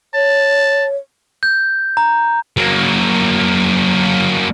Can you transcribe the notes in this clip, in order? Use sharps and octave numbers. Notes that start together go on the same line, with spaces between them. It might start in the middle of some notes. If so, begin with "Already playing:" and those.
C#5 A5
G6
A#5
F#3 A#3